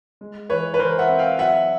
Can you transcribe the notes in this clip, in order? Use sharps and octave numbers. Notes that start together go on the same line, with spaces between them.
G#3
E3 B4 C#5
B4
E3 A#4 C5
E5 F#5
C4
F5 G5
F#3 E5 F#5